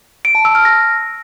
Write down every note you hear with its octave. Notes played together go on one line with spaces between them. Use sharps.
D7
A5
E6
F6
A#6